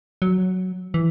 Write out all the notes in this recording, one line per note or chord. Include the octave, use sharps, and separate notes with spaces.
F#3
E3